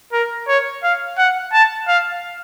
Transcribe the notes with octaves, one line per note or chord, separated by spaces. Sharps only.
A#4
C#5
F5
F#5
A5
F5